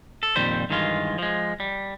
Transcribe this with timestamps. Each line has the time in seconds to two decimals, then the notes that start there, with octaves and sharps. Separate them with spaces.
0.23 A4
0.36 F2 A#2 D#3 G3 C5
0.70 G2 D#3 E3 G#3 F4
1.18 F3 G#3
1.60 G3